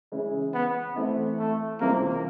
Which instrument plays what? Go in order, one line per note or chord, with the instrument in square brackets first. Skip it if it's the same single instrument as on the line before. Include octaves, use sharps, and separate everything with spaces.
[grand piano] C#3 E3 G#3 C#4 E4
[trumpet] B3
[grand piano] E3 A3 C4
[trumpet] A3
[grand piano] C#2 C3 E3 G3 C4 [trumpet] A#3